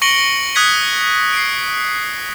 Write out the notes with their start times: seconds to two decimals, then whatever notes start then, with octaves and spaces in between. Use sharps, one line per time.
0.02 C#6 A#6 C#7 D7 F#7 G7
0.55 D#6 F#6 G#6 B6 C#7
1.33 C7 D7